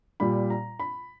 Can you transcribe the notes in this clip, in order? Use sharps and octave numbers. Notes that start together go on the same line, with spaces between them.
A#2 G3 B5
A#5
B5